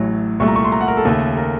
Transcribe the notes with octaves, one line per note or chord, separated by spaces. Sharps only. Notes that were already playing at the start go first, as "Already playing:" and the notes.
Already playing: A1 A2 F#3
C2 A#2 A3 C#6
A#5
C#6
C6
A#5
F#5
A#4
A4
D#2 C#3 A3
A#4